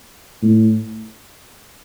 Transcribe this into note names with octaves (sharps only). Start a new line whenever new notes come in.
A2